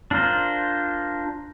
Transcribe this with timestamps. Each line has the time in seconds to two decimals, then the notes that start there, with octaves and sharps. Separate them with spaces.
0.11 D4 F4 A#4 C5